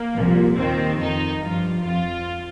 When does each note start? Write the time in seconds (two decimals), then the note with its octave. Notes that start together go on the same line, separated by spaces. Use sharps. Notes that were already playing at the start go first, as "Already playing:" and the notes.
Already playing: A#3
0.16 C2 A#2 F3
0.57 D#2 D#3 C4
0.99 F2 D#3 D#4
1.42 G2 F3 F4
1.84 F2 F3 F4